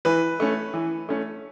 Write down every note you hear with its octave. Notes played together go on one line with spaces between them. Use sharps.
E3 B4
A3 C#4
E3
A3 C#4